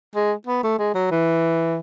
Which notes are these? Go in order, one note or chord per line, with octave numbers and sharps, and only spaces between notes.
G#3
B3
A3
G#3
F#3
E3